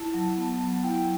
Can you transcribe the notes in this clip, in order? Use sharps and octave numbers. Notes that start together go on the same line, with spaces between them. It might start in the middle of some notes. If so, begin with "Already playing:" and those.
Already playing: E4 A5
F#3
B3
F#3
E4 G5